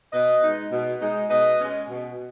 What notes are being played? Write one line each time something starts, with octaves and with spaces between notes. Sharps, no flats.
B2 B4 D#5
G#3 D#4
B2
G#3 D#4
B2 B4 D#5
G#3 C#4
B2